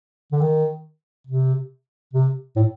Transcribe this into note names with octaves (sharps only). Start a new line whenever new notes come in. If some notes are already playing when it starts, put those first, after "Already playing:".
D3
D#3
C3
C3
A2